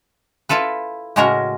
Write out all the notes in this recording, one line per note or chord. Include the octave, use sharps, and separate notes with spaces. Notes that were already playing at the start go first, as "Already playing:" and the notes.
E4 F4 A4 B4
A2 C#3 G#3 C#4 F#4 A#4